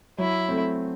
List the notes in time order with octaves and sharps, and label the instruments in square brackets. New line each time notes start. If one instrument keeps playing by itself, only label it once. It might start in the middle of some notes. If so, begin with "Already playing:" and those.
[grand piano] F#3 [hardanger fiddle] E4
[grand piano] A3 C4